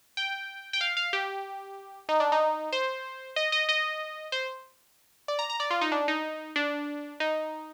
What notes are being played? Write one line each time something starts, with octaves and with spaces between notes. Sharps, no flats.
G5
G5
F5
F5
G4
D#4
D4
D#4
C5
D#5
D#5
D#5
C5
D5
A#5
A#5
D5
F4
D#4
D4
D#4
D4
D#4